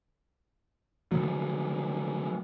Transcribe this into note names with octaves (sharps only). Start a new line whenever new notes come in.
D3 F3 F#3